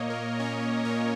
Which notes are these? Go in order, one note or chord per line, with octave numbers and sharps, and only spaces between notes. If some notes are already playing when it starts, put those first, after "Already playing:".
Already playing: A#2 A#3 C#5 D#5
A#4
C#4 C#5
A#2 C#5